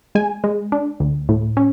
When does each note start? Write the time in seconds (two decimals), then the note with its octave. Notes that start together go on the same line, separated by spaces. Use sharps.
0.15 G#3 G#5
0.44 G#3
0.72 D4
1.00 D2
1.29 A2
1.57 C#4